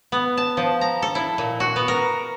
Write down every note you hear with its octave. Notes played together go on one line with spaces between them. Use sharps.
B3
A5
F3
A#5
A4
E4
A#2
F#4
B3
A#4